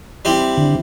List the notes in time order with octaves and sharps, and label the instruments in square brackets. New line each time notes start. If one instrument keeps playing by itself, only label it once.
[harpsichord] G3 C4 E4
[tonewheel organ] D3